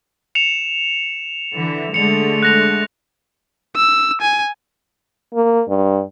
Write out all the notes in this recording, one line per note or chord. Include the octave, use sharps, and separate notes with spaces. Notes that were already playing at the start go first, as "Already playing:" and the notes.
C#7 E7 F7
D3 E3
D3 G#3 A3 C#7 F7
F#6 A#6 F7
E6
G#5
A#3
G2